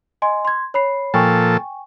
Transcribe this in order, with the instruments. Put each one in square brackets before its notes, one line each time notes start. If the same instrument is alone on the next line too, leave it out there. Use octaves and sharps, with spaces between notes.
[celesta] D#5 G#5 C6
C6 G#6
C#5 B5 C7
[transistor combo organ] A#2 F3 A4 [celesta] G5 G#5 C#6